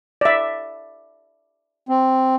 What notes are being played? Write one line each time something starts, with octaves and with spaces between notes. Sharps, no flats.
D5 E5
C4